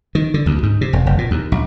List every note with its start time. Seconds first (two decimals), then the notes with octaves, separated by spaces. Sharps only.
0.15 D#3
0.34 D3
0.46 D2
0.63 G#2
0.81 C3
0.93 E1
1.06 F1
1.18 A#2
1.31 D#2
1.52 A#1